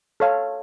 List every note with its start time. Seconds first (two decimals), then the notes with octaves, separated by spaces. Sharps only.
0.20 A4 C#5 F5